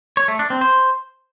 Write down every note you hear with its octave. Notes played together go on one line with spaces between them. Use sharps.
C#5
A3
D4
C4
C5